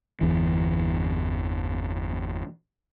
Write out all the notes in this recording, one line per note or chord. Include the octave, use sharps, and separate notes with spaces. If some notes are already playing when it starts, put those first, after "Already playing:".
G1 E2 E3